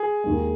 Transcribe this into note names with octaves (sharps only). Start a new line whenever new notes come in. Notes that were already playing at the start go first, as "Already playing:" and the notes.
Already playing: G#4
D#2 D#3 G#3